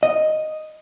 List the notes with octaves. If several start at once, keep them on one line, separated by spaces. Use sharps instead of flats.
D#5